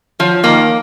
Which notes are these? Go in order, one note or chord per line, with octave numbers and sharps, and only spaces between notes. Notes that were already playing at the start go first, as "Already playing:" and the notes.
F3 F#3
D#3 A#3